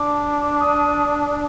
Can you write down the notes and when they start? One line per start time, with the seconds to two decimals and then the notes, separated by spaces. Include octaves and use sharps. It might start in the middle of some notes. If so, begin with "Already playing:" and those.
Already playing: D4 D6
0.60 D#6